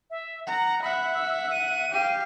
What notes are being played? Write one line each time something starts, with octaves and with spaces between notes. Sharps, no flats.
E5
F#5 A#5
E5 F#5 B5
E6
D#7
G4 F5